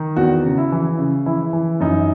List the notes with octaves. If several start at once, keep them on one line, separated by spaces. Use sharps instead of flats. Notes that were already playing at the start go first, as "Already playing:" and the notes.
Already playing: D#3
E2 F#4
C#3
E4
E3
C#3
E3 E4
E3
F#2 D#4